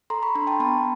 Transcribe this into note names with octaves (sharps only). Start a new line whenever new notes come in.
A4 A#5 C6
B5 C#6
D4 A#5 C6
G5 A5
B3 A5 B5